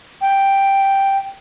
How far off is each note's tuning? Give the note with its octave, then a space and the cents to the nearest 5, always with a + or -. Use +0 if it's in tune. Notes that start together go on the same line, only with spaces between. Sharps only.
G5 +0